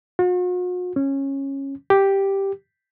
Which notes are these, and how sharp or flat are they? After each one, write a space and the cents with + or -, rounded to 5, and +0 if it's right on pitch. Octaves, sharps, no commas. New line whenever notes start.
F#4 -45
C#4 -15
G4 +0